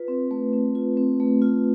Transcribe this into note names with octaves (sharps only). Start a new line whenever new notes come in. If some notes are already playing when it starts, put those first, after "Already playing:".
Already playing: F4 B4
C4
A3
C4
F4
C4
A3
F4